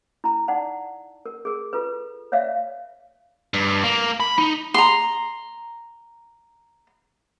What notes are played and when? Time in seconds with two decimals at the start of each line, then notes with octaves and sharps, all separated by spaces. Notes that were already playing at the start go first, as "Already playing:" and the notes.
0.24 E4 A#5
0.48 D#4 D5 F#5 A5
1.26 A#4
1.45 G#4 A#4
1.73 F4 A4 B4
2.32 C#5 D5 E5 F5
3.54 G2
3.84 A#3
4.20 B5
4.39 D#4
4.74 A#5 C6